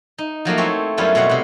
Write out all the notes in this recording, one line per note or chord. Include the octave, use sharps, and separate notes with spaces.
D#4
F3 F#3 A3 A#3
A3 C4 E4 C#5
F#2 G3 B3 C#4 E4 F4
B2 G3 C4 C#5 F#5
C3 F#5